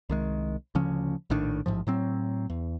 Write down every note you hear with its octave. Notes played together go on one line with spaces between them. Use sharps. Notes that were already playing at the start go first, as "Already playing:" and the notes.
C2 D#3 G#3
D2 C#3 F3 C#4
A#1 A2 D#3 D4
A1 G#2 F3
A2 F#3 C4
E2